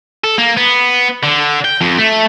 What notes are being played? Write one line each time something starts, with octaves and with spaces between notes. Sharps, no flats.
A4
A#3
B3
D3
G5
F2
A3